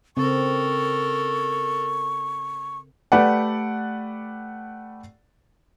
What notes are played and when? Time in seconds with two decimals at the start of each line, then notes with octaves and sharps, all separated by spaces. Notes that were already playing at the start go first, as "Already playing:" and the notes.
0.17 C#3 C4 A4 A#4 C#6
3.12 A3 G4 B4 D5 F#5